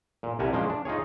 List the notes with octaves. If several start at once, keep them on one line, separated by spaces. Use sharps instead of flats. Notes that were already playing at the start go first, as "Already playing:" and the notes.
A#2
C2 G3 A#4 F#5 G#5 A5
F3 G#3 A#3 C#4 D4
D4
D#4 F4 G#4 C#5